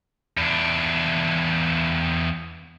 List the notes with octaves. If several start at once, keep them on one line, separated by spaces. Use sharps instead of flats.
E2 D4